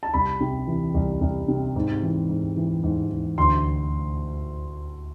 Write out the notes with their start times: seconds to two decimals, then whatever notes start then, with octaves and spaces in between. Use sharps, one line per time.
0.03 A5
0.14 C2 B5
0.40 C3
0.67 E3
0.94 C2
1.21 C2
1.48 C3
1.76 G#2
2.03 E3
2.29 G#2
2.57 E3
2.83 G#2
3.11 E3
3.38 D2 C6